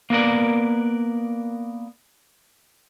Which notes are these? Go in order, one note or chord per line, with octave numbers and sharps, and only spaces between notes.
A#3 B3 A#4 D5